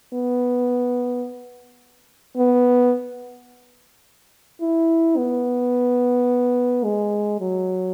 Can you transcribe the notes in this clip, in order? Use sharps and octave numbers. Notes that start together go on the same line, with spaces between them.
B3
B3
E4
B3
G#3
F#3